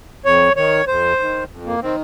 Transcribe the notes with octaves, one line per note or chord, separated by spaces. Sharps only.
F2 C#5
D#3 C#5
F2 C5
D#3
F2
A#3
D#3 C4